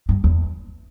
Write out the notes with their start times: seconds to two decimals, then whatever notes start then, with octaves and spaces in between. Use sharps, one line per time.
0.09 G2
0.24 E2